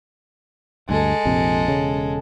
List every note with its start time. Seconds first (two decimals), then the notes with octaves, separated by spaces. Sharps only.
0.89 D2 G2 G#3 A4
1.25 A#1 F2 C3
1.68 E1 C#3